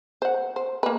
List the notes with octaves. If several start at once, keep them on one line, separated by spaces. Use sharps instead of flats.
C5 F#5
C5
A#3 B4